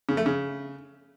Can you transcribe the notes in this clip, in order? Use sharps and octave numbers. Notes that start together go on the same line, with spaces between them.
C#3
A3
C#3